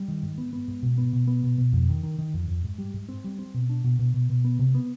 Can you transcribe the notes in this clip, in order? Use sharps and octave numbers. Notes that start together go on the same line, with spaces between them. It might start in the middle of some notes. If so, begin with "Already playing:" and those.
Already playing: G3
D#3
G#2
B3
B3
G#2
B2
B3
B2
B3
B2
B2
F2
D#3
D#3
D#3
F2
F2
G#2
G3
G#2
C4
G3
C4
B2
D4
B2
B2
B2
B2
B3
C3
B3